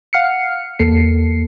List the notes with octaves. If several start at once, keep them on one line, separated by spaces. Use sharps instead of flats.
F5 F#5 F6 C7 C#7
E2 A#3 A4 C7 C#7